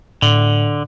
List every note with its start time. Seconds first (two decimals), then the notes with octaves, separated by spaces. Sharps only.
0.22 A2 D3